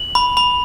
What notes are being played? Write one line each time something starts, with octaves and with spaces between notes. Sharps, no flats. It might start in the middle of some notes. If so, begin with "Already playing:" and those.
Already playing: F#7
B5
B5